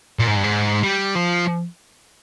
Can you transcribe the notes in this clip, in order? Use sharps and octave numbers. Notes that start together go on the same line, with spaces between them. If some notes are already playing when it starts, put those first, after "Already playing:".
A#2
G#2
G2
G#2
G3
F3